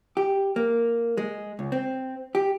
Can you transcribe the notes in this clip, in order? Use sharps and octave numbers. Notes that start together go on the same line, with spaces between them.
G4
A#3
G#3
C#2
C4
G4